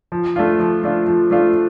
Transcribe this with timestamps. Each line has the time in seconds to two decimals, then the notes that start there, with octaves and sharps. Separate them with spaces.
0.12 F3
0.36 A3 D4 F4
0.59 F3
0.84 A3 D4 F4
1.07 F3
1.31 A3 D4 F4